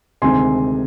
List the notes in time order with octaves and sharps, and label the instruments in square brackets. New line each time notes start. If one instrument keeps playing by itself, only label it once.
[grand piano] D2 C3 D#3 G#3 C4 G#5 C6